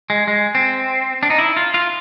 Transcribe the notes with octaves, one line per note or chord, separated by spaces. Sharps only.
G#3
G#3
C4
D4
D#4
E4
F4
F4